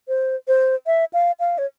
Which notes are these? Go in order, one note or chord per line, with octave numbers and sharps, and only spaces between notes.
C5
C5
E5
F5
F5
C#5